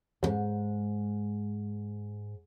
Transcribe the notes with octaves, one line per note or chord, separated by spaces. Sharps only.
D#2 G#2